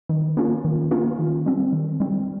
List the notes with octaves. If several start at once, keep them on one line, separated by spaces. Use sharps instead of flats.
D#3
A#3 C#4 F4
D#3
A#3 C#4 F4
D#3
G3 C4
D#3
G3 C4